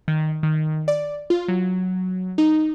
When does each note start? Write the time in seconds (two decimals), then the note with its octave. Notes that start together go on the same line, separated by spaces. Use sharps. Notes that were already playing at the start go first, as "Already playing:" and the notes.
0.08 D#3
0.43 D#3
0.88 D5
1.30 F4
1.48 F#3
2.38 D#4